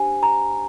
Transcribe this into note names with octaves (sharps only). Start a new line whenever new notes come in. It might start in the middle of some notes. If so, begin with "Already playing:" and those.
Already playing: D4 G4 C5 G#5
A#5